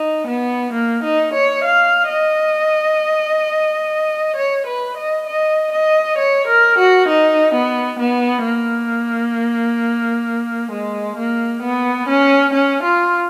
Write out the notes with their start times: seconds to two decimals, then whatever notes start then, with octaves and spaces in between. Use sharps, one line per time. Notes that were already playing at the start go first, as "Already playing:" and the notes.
Already playing: D#4
0.27 B3
0.73 A#3
1.03 D#4
1.34 C#5
1.64 F5
2.09 D#5
4.36 C#5
4.67 B4
4.97 D#5
5.27 D#5
5.72 D#5
6.18 C#5
6.48 A#4
6.78 F#4
7.08 D#4
7.54 B3
7.99 B3
8.45 A#3
10.71 G#3
11.17 A#3
11.62 B3
12.08 C#4
12.53 C#4
12.83 F4